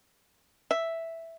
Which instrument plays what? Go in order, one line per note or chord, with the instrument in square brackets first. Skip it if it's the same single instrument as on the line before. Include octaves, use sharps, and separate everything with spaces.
[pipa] E5